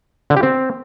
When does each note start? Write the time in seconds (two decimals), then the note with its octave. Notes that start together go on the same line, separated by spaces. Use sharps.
0.30 D3
0.36 G4
0.43 C4